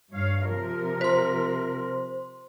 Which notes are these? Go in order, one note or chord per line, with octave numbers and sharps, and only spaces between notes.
G2 C#5 F5
C3 F3 A#4
C5 C6